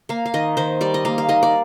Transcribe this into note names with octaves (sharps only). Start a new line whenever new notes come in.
A#3 F5
F5
D#3 D#5
D#3 C5
G3 D5
D#5
A#3 F5
F5
D#3 D#5
D5